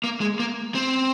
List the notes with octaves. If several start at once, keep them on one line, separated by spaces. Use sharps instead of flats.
A#3
G#3
A#3
C4